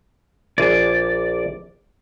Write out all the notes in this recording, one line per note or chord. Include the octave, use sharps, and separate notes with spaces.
A#1 G#4 D5